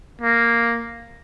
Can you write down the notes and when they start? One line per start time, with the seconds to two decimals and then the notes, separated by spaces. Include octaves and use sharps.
0.21 A#3